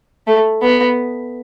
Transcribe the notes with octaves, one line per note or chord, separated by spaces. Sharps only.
A3
B3